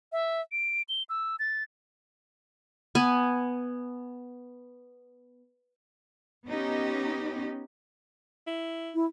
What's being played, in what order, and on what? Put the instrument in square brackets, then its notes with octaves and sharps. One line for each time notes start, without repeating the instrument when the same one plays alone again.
[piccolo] E5
D7
G7
E6
A6
[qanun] B3 G#5
[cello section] B3 C#4 D#4 G4
[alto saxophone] E4
[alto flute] E4